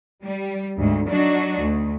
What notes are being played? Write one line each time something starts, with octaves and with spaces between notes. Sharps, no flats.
G3
D2 G#2
F#3 D4 D#4 F#4
D2